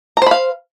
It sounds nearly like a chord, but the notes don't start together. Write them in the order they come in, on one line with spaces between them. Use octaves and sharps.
A#5 C5 B5 F5